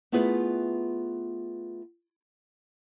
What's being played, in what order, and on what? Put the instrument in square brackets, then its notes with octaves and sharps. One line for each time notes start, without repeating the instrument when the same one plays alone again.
[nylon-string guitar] A3 B3 E4 F4 G#4 B4